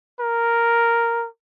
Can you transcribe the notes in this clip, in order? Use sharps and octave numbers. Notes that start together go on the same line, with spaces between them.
A#4